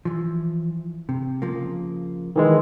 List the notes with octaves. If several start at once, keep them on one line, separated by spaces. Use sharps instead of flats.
E3 F3
C3
C#3 F3 A#3
D#3 E3 G#3